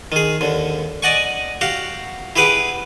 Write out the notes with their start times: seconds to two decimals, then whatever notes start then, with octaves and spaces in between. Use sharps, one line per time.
0.12 D#3 G#4
0.41 D#2 D3
1.03 D5 D#5 F#5 G#5 C#6
1.61 F#4 G4 F5 F#5
2.36 E4 G4 G#4 B4 F#5 D6